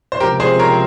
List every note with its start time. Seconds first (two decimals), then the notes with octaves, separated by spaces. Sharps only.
0.12 C5
0.20 C#2 C3 F3 C4 G4 A#4
0.40 G#4 C5
0.59 A#4 C#5